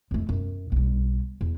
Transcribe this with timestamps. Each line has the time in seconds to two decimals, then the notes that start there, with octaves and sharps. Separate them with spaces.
0.11 F2 A3
0.29 F#2
0.72 B1 G3
1.41 E2